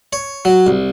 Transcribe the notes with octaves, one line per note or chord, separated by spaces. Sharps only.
C#5
F#3
C2